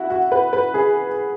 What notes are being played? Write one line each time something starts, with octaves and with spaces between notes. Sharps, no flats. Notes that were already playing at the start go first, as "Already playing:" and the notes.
Already playing: E4 F#4
F#4
B4
B4
G#4